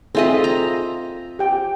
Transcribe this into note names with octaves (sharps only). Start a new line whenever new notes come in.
C4 F4 G#4 A4 D#5 E5
A#5
G4 G5